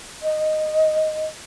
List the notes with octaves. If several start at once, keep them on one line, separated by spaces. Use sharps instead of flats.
D#5